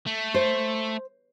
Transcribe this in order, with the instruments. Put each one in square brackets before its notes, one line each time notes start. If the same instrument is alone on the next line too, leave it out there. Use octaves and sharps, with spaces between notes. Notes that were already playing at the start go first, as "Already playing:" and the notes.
[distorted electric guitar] A3
[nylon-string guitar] C5